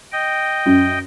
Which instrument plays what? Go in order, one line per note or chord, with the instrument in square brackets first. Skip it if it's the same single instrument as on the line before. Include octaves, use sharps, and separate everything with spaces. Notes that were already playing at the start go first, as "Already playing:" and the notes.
[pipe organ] D#5 G5
[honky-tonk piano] F#2